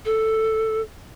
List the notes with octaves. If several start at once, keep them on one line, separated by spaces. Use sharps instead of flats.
A4